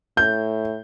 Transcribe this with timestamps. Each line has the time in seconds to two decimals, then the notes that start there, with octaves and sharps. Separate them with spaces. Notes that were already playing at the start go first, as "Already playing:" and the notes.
0.17 A2 G6